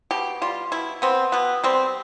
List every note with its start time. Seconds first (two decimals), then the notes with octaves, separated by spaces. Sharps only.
0.11 B2 G4
0.42 G3 F4
0.72 B2 E4
1.02 B3 C4
1.32 B2 B3
1.64 G3 C4